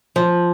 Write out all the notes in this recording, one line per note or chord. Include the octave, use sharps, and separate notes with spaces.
F3